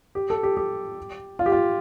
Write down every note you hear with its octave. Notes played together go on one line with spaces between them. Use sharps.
G4
A4
G4
G4
F4
G4
F4